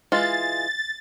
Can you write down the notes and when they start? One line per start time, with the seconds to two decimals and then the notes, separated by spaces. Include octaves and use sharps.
0.12 E3 G#3 F4 A6